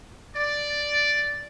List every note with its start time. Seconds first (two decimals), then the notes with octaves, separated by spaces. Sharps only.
0.36 D5